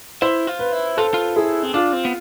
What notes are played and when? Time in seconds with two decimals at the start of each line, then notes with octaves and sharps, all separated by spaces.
0.22 E4 C5
0.47 F4
0.59 B4
0.72 E4
0.97 F4 A4
1.14 F4
1.36 E4 G#4
1.63 C4
1.74 D4 F4
1.93 C4
2.05 B3